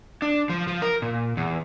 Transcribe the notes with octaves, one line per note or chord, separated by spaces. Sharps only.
D4
F3
F3
A#4
A#2
E2